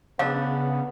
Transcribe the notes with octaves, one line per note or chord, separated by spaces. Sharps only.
C#3 F#3 B3 D4 F5